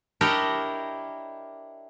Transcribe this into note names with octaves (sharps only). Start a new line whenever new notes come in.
D4 E4 G4 A#4 C#5 D#5